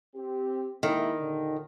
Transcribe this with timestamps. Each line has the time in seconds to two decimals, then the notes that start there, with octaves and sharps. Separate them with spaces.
0.15 C4 G4
0.83 D#3 G#3 A#3 E4
1.19 D#2 A#2 D3